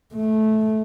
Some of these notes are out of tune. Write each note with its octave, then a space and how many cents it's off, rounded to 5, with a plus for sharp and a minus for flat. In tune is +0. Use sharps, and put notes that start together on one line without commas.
A3 -15